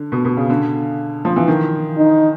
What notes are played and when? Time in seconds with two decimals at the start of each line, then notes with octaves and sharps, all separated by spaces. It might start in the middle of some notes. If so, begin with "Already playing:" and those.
Already playing: D3
0.12 B2
0.25 B2
0.37 C#3
0.50 D3
1.25 F3
1.36 E3
1.48 D#3
1.97 D#4